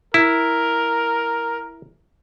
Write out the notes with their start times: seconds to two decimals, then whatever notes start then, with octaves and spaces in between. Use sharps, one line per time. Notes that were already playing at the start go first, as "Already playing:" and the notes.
0.14 E4 A#4